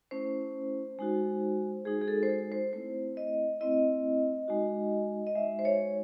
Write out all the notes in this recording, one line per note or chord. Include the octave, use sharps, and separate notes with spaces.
A3 C#4 E4 C5
G#3 D#4 F#4
G#3 D#4 F#4 G#4
G#4
A4
C5
A4
C5
A3 C4 E4 C5
D#5
A3 C4 E4 D#5
G#3 D#4 F#4
D#5
G#3 D#4 F#4 E5
C5
C#5